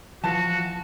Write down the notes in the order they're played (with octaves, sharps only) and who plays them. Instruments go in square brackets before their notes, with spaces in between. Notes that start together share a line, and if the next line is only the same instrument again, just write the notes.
[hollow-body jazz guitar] E3 F3 [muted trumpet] F#4 [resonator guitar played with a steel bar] A5